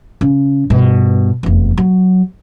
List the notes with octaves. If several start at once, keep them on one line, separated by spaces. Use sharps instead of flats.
C#3
G2 B2
F1 E2
F#3